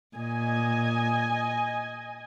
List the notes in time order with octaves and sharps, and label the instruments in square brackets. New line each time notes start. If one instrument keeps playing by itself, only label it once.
[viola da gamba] A#2 [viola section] D#5 G#5